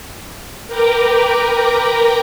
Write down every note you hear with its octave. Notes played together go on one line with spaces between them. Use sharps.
A#4 B4 G5 A#5 D6